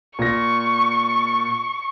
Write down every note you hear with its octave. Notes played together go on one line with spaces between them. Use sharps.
A#2 C#6 A#6